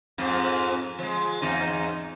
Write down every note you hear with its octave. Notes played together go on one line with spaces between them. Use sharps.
F2 G#2
F3 G#3
E2 G#2 D#4